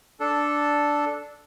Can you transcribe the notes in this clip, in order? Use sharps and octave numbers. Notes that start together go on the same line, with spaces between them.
D4 A4